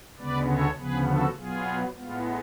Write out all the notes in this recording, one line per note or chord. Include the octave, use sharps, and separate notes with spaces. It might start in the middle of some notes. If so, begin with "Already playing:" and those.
D2 C#3 G#3 B3 B4 D5
A4 C#5
D2 C#3 F3 B3 G#4 B4
F#4 A4
B2 F#3 B3 F4 G#4
A2 G#3 B3 F4